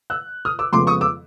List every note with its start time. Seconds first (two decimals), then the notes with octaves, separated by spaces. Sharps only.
0.10 E6 F#6
0.45 D#6 F6
0.59 D6 E6
0.73 F2 C#3 F3 G#3 B3 C6 D6
0.87 C#6 D#6
1.01 D6 E6